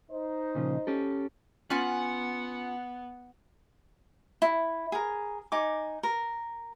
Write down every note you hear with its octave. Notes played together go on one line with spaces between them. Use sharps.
D#4 C5 D#5
A#2 C#3 F3
C#4 G4 A4
B3 C#4 F4 F#5 G#5
E4
G#4 A#4
D#4 G#5 D6
A#4